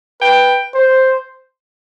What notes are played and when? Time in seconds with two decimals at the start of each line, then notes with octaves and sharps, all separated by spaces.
0.21 B4 G5
0.74 C5